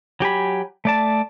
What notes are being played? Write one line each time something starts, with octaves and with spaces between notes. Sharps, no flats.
F#3 G4 G#5 B5
A3 D5 A5